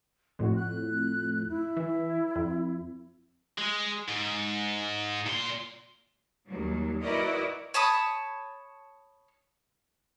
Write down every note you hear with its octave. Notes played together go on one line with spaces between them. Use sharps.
F2 A2 F#4
F#6
E4
E3
F2
G#3
G#2
A#2 C6
D#2 F#3 G3
E4 F#4 A#4 B4 D5 D#5
C#5 A5 B5 D#6